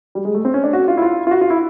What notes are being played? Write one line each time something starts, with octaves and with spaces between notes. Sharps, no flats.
G3
G#3
A3
C4
C#4
D4
F#4
F4
E4
F4
F4
F#4
F4
E4